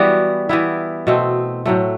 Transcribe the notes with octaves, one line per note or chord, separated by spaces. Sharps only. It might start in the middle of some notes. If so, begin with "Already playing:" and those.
Already playing: E3 G3 B3 F#4
E3 B3 E4
B2 A3 C4
A2 F#3 A3